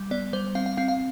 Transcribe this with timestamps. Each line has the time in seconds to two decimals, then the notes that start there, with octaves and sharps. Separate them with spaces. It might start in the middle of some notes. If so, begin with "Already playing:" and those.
Already playing: G3
0.11 B3 D5
0.33 G3 C5
0.55 C4 F5
0.66 F5
0.77 C4 F5
0.88 F5